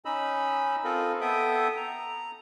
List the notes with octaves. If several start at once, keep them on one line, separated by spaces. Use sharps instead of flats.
C#4 D#4 D#5 B5 E6
C4 F4 A4 A#4 D#5
B3 A4 E5 G5 D#6
A#5